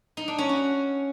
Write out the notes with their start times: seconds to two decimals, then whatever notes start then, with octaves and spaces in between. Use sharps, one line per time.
0.17 D#4
0.28 D4
0.38 C#4
0.49 F#4